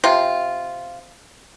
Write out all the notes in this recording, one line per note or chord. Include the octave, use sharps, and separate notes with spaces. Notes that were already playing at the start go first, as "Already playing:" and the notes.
C3 F4